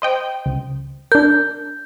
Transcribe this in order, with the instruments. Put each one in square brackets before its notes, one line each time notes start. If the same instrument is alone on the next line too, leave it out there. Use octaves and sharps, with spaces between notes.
[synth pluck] C5 D#5 G5
C#2
[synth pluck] D4 A#4 [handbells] G6